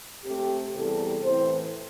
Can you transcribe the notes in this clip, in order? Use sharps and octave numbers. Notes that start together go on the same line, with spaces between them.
C3 A3 C4 G4
E2 C3 G3 A4
A2 E3 C4 C5